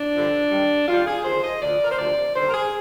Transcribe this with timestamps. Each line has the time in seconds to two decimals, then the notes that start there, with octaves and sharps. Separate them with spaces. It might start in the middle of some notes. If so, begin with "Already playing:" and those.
Already playing: D4
0.14 G2 D3 F3
0.51 G2 D#3 G3
0.88 F2 D#3 G3 F4
1.07 G#4
1.24 D#2 D3 F3 C5
1.43 D#5
1.62 D2 D3 F3 D5
1.84 A#4
1.91 C5
1.98 D2 C3 F3 D5
2.36 D#2 D3 G3 C5
2.48 A#4
2.54 G#4